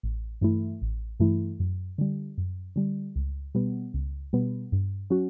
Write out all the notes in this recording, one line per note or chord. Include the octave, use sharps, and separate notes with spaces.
A1
G2 E3 A3 E4
A1
G2 E3 A3 E4
F#2
D3 G3
F#2
D3 G3
C#2
B2 G3 B3
C#2
B2 G3 B3
G2
F#3 C#4 F#4